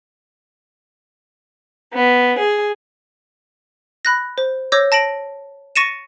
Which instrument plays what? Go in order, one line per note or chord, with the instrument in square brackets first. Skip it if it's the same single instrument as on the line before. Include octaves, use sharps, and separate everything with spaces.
[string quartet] B3
G#4
[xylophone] B5 F#6 A#6
C5
C#5 D6 E6 G6 A#6
A5 A#6 D7 F#7
C#6 A6 A#6 C#7 D#7 E7